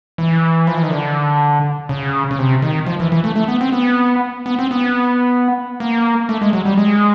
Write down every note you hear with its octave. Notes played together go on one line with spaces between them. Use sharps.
E3
F3
E3
D#3
D3
C#3
C#3
C3
D#3
F3
E3
E3
A3
A3
B3
C4
B3
B3
C4
B3
A#3
A3
G#3
F#3
G3
G#3